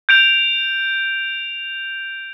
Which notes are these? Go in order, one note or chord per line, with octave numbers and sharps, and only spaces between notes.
G6 D7 F7